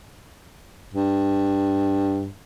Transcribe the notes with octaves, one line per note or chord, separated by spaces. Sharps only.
G2